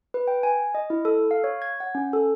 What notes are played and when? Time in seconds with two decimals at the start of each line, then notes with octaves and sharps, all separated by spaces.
0.14 B4
0.28 G5
0.43 G#5
0.75 D#5
0.90 E4
1.05 A4
1.31 F5
1.44 C#5
1.62 G#6
1.80 F#5
1.95 C#4
2.13 A4